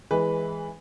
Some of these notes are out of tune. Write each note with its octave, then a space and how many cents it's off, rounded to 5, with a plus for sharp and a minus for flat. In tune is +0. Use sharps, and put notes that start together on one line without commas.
E3 -10 G#3 +0 B4 +0